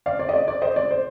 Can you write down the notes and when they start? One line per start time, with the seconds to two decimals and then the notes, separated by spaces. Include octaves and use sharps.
0.06 D5 F5
0.19 D5
0.29 D#5
0.34 D5
0.48 D5
0.62 C5 D#5
0.76 D5
0.91 C5